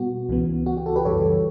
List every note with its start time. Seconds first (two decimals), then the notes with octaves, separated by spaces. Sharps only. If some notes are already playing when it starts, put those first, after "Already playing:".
Already playing: B2 G3 B3 F#4
0.29 C#2 C#3 E3 B3
0.66 F#4
0.77 G4
0.86 F#4 A4
0.96 G4 B4
1.05 F#2 C#3 E3 G3 A4 C#5